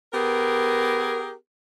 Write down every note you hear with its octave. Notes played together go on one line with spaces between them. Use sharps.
B3 G4 G#4 A#4